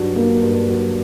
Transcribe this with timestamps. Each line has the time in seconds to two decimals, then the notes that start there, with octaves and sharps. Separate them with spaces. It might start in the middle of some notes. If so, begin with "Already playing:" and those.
Already playing: G2 F#3 D4
0.16 A#3
0.42 G2
0.69 F#3